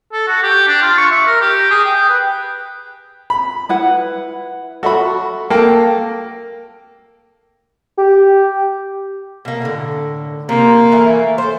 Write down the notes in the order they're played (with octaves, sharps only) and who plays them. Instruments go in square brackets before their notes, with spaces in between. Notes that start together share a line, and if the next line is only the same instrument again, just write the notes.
[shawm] A4
F#4
G4
D4
F4
C#6
E5
A#4
G4
G#4
G5
B4
[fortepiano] B5
[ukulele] E4 B4 F#5
[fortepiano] F#4 [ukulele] A4 E5 B5
[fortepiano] A#3 [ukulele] A4 G5
[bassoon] G4
[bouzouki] B2 A#3
A2 D3
[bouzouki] C3 F3 [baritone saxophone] A#3
[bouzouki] E3 A3 A#4
A4 C5